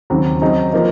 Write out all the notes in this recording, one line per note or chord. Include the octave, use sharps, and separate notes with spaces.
D#2 C#3 F#3 C4
C#3 F#3 C4 D#4 G#4
F3 A#3 D#4